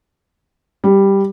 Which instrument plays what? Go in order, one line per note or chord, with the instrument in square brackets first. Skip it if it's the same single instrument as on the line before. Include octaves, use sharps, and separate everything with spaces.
[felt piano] G3